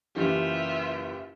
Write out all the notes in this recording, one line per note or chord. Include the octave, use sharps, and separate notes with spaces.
F#1 E3 F4 G4 E5